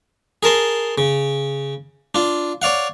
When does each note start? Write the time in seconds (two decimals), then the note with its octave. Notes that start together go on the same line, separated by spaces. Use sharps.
0.43 G#4 A#4 A5 C6
0.98 C#3
2.15 D4 F4
2.62 C#5 D5 F5 F#5